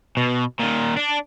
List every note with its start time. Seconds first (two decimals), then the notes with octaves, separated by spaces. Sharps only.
0.17 B2
0.60 A#2 D#3
0.97 D4